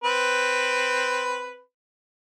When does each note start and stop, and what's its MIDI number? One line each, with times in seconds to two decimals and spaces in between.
0.04 1.60 60
0.04 1.60 71